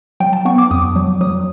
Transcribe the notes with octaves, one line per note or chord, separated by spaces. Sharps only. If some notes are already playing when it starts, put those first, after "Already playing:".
F#3 G5
A5
B3 C#6
D6
F2 D#6
F#3
F#3 D#6